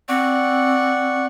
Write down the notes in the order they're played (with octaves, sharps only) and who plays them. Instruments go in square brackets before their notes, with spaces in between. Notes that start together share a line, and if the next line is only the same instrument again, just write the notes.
[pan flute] C4 [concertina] D5 F#5 C#6